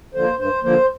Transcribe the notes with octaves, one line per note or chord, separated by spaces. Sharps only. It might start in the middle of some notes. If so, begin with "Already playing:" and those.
D3 F3 A#3 C5
G2 C5
D3 F3 A#3 C5